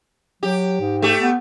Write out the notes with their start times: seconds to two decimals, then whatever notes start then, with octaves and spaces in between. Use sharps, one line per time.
0.43 F#3 G4
0.81 G#2
1.02 A3 G4
1.19 B3